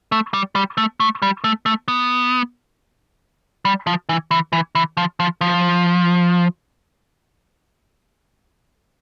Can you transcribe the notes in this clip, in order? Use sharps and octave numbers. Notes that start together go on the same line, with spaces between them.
A3
G3
G3
A3
A3
G3
A3
A3
B3
G3
F3
E3
E3
E3
E3
F3
F3
F3